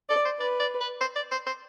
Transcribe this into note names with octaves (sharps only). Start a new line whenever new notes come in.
A4 D5
C5
B4 D5
D5
B4
C5
D5
C5
C5